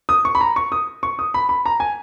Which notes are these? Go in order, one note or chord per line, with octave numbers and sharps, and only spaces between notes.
D#6
C#6
B5
A#5
C#6
D#6
C#6
D#6
B5
B5
A#5
G#5